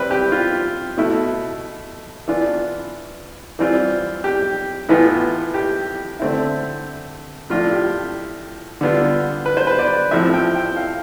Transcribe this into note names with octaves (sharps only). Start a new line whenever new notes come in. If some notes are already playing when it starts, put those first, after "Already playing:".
Already playing: C3 G3 C4 E4 B4
G4
F4
B2 A3 E4
E3 B3 D4 F4
E3 G3 C4 F4
G4
A2 E3 B3 F4
G4
D3 A3 C4 E4
A2 F3 A3 D4 F4
G4
D3 G3 B3 F4
B4
C5
B4
D5
A2 F3 C4 E4 E5
G5
G5
F5